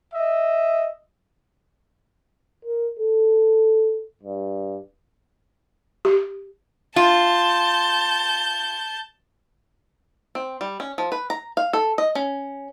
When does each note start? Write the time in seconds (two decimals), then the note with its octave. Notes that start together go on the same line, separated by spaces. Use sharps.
0.14 D#5 E5
2.65 A#4
2.99 A4
4.23 G2
6.05 G4
6.96 F4 A5 G6
10.35 C4
10.61 G3
10.80 C#4
10.98 F3
11.12 B4
11.30 A#5
11.57 F5
11.73 A4
11.98 D#5
12.15 C#4